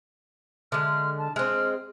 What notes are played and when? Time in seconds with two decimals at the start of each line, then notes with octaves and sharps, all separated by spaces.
0.72 D3 G#3 F6
1.18 A5
1.36 G#3 C4 F6